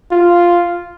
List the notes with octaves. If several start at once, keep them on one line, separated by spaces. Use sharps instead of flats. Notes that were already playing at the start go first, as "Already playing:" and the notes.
F4